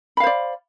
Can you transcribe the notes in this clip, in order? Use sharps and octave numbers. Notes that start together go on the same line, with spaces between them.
C5 D5 F5 B5